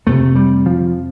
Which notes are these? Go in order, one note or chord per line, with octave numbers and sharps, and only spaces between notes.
F2 C3 A3
G3
F3